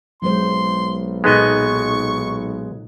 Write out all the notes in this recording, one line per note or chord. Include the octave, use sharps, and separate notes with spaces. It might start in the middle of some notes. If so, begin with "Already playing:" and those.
B1 F#3 G#3 C5 C6
A#2 G#3 B3 D#4 A4 D#5 C#6